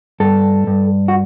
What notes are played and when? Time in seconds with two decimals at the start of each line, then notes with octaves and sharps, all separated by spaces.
0.20 G2 A4
0.67 G2
1.08 F#4